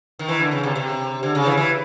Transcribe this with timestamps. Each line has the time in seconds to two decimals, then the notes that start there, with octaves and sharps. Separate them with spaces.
0.19 D#3
0.28 E3
0.40 D3
0.51 C#3
0.63 C3
0.75 C3
1.23 D3
1.35 C#3
1.46 E3
1.57 E3